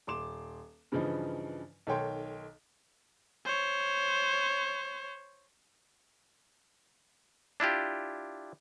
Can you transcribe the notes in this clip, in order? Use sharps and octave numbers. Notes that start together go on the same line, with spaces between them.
D#1 C6 D6 E7
G2 C#3 E3 F3 D#4
B1 D#3 A4 C#5 G5 C6
C5 C#5
D4 E4 F4 G4